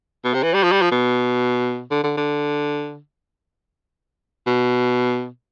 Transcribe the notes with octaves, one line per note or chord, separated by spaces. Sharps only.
B2
C3
E3
G3
F3
G3
F3
B2
D3
D3
D3
B2